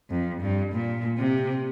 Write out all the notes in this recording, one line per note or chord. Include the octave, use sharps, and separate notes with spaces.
F2
G2
A#2
C3